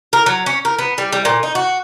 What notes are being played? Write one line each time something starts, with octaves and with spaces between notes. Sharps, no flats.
A#4
F#3
C#4
A#4
B3
G3
G3
A#2
D#4
F#4